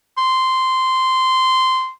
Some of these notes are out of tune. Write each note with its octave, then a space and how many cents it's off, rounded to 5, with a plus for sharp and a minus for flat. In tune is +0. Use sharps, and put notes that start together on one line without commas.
C6 -10